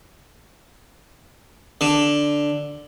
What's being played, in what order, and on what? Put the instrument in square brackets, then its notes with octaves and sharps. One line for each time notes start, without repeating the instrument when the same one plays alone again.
[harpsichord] D3